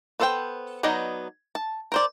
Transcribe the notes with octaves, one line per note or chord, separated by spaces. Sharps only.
B3 A4 C5 F#5 G5
F#3 B3 D#4 D5 D#5
A5
A#4 C5 D5